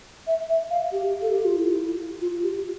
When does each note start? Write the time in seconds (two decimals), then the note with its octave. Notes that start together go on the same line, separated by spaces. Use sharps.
0.27 E5
0.49 E5
0.71 F5
0.92 G4
1.22 A4
1.33 G4
1.45 F4
1.56 E4
2.21 F4
2.43 G4